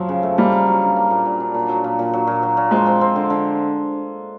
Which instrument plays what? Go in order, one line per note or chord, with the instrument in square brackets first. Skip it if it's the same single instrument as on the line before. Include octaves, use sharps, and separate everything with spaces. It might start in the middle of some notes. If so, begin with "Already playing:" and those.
Already playing: [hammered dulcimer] F3 [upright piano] F#3
[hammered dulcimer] C#3
A3
[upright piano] G3 [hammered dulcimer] A#3
[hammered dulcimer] A#3
F#3
D4
A#3
A#2
A#2
D4
A#2
F#3
A#2
A#2
F#3
A#2
F#3
A#2
[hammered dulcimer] F3 [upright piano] G#3
[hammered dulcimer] C4
C4
D3
D3